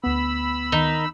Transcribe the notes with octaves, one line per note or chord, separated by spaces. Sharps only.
D2 B3 B5 E6
D#3 D#4